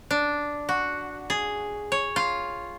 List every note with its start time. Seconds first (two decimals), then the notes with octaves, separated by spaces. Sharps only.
0.11 D4
0.69 F#4
1.30 G#4
1.92 C#5
2.16 F4